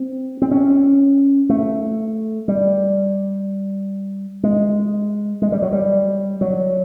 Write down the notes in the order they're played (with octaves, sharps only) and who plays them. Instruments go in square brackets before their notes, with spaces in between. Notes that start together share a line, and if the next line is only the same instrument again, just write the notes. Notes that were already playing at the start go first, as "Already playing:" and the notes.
Already playing: [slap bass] C4
C4
C#4
A3
G3
G#3
G#3
G3
F#3
G3
F#3